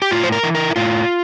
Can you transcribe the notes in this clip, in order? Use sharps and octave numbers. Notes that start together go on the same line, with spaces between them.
G4
A2 F4
C5
A#4
E3
A#4
E4
A2 F4